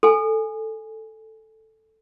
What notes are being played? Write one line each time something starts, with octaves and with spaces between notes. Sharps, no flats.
A4 G#5